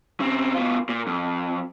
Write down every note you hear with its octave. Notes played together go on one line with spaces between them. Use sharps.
C#3 C4
B2 F4
A#2
F2